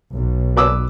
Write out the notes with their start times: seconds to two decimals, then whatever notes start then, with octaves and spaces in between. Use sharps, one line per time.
0.14 B1
0.57 B4 D6 E6